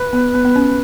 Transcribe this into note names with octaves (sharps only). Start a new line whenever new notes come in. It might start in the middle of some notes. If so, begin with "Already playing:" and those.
Already playing: B4
B3
B3
B3
C#4